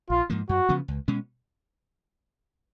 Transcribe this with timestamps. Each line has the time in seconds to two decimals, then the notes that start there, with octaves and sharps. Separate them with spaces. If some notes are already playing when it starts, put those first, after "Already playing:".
0.10 A#1 F4
0.30 G#2 F3 A#3
0.49 F#2 F#4
0.69 C#3 F3 B3
0.88 C#2
1.08 B2 G#3 C#4